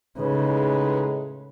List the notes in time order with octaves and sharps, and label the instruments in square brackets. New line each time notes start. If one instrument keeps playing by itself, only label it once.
[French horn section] A2 G#3 D#4 [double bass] C#3 [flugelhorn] B4